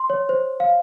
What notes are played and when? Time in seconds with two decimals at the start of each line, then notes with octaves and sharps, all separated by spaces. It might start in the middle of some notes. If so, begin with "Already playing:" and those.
Already playing: C6
0.10 C#5
0.29 C5
0.60 F5